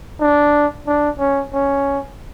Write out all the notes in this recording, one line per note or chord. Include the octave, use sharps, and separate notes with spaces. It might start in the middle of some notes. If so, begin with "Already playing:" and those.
D4
D4
C#4
C#4